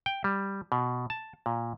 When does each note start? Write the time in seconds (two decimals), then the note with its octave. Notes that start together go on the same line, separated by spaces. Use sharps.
0.06 G5
0.24 G3
0.72 B2
1.10 A5
1.46 A#2